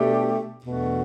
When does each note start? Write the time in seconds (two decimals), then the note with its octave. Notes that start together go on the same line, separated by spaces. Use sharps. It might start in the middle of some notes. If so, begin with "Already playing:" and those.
Already playing: B2 A3 D4 G4
0.64 E2 B2 A3 D4 F#4